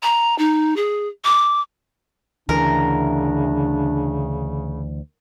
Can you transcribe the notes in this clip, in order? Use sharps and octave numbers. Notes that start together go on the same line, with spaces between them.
A#5
D#4
G#4
D6
D2 C#3 E3 D4 A#4